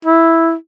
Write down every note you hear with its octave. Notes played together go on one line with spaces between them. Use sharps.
E4